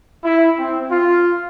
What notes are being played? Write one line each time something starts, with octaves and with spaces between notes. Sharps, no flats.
E4
C4
F4